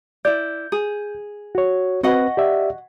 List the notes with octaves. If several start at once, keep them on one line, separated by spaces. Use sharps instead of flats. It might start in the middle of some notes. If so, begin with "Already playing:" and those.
E4 D5 G6
G#4
F#4 C#5
C4 F#4 B4 D#5 F#5
G4 D5 E5